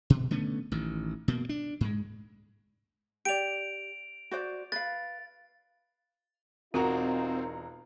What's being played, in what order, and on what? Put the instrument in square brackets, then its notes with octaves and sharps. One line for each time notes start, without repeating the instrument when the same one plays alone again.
[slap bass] B2
D3 A3 B3 C#4
A1 D#3
B2 A#3
D4
G#2 G#3
[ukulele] G4 D5 [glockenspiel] D7 F7
[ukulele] F#4 C5 D5
[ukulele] B4 F5 [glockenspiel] A6
[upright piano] E1 F#4 A#5 [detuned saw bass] C4 [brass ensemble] D#4 F4 [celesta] A#4